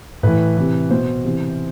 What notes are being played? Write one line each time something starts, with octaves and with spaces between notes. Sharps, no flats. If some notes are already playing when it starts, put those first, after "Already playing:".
A2 E3 B4
C3 E3
B2 C5
C3 E3